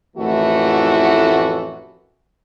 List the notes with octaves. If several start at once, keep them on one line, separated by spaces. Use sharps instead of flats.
A1 F2 D#3 E3 A3 F#4